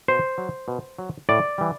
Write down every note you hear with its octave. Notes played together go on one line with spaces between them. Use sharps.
B2 C5
F#3
B2
F#3
A2 D5
E3 G3